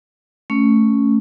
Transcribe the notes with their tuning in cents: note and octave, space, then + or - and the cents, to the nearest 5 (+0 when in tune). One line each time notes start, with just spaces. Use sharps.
A3 +0 C#4 +0